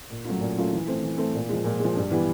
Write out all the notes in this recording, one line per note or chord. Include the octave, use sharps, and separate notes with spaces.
A#2
F#3 A3 C#4 F4
A#2
F#3 A3 C#4 F4
E3
A3 C4
E3
A3 C4
A#2
F3 G#3
A#2
F3 G#3
G2
E3 G3 B3